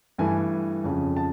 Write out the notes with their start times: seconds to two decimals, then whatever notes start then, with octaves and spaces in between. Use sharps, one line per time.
0.18 G2 E3 A3 G#5
0.84 F2 C#3 F3
1.17 A5